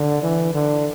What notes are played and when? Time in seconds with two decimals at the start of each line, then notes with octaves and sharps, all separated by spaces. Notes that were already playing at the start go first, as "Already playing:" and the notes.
Already playing: D3
0.23 E3
0.54 D3